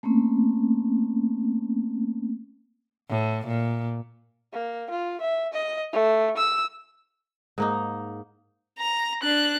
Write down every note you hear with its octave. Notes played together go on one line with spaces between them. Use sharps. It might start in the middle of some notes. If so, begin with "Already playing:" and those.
A3 A#3 C4 C#4
A2
A#2
A#3
F4
E5
D#5
A3
E6
G#2 A#3 D#4
A#5
D4 F#6